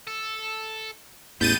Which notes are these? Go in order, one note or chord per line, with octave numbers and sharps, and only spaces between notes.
A4
A1 E2 G#3 B3 G6 A6 D#7